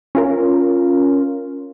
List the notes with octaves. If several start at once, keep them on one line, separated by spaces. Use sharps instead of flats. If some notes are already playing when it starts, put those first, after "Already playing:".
C#4 F4 A#4